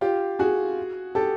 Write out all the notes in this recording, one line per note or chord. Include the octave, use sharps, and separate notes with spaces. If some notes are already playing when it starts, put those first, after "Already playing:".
F4 G4
F#4 G#4
G4 A4